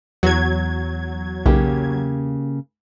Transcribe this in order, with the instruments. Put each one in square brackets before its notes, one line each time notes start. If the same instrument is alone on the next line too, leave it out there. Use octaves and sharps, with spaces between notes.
[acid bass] E2 [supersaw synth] F#3 G#6
[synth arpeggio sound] B1 [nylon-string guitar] C#3 A#3 G4